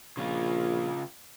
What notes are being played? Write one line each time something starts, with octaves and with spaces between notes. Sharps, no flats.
A#1 C#3 F4